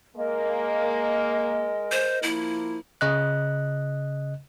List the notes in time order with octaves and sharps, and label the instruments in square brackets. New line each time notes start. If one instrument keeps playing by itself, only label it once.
[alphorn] G#3 [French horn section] A#3 [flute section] A#4 D#5
[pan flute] C5
[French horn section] F3 A#3 [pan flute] E4
[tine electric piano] C#3 D#5 F#6